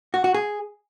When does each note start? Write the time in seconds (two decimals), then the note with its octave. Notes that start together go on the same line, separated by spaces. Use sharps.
0.14 F#4
0.24 F#4
0.34 G#4